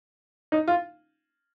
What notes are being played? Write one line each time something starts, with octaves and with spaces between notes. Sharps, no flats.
D#4
F4